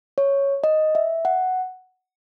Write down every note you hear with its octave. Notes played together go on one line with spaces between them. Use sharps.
C#5
D#5
E5
F#5